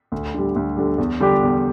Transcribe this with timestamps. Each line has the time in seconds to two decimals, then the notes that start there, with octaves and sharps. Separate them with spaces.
0.12 D2
0.34 D3 G3
0.56 D2
0.77 D3 G3
0.98 E2
1.20 D3 G3 D4 G4
1.43 E2